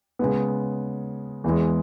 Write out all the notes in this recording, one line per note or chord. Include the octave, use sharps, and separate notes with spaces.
C#3 G#3 B3
E2 E3 G#3